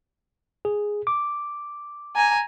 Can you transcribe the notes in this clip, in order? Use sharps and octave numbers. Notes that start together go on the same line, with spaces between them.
G#4
D6
G#5 A#5